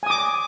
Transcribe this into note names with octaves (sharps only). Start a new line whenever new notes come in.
G#5 D6 D#6